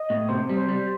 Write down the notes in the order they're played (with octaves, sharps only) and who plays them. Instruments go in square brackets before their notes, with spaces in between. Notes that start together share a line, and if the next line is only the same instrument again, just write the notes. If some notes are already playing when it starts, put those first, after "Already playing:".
Already playing: [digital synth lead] D#5
[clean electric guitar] A2
[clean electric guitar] C3 [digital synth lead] C5
[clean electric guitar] G3
[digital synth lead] C5
[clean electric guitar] G3